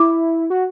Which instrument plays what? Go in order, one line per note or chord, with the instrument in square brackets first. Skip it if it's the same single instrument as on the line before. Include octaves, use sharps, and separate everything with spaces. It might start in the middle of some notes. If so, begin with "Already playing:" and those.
Already playing: [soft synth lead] E4 [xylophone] D6
[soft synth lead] F#4